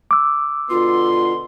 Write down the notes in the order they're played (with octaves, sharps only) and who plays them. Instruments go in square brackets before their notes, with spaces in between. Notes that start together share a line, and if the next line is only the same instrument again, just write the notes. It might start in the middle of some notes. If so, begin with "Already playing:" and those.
[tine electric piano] D6 E6
[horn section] B2 D3 C6 [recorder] F4